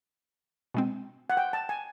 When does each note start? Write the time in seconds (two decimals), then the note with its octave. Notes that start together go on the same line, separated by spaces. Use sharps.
0.74 B2 G#3 C4
1.30 F#5
1.37 G5
1.53 A5
1.69 G#5